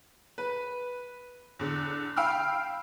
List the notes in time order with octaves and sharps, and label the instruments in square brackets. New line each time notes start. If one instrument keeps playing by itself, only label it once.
[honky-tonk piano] B4
E2 D3
F5 G5 B5 E6 F6